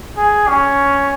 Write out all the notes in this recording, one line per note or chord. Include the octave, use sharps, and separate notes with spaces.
G#4
C#4